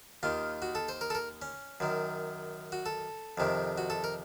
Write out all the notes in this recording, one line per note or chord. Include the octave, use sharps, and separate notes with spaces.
D#2 D#3 F4
F#4
A4
C5
A#4
A4
A#4
C#4
F#2 D#3
F#4
A4
F2 C3 D#3
F#4
A4
A#4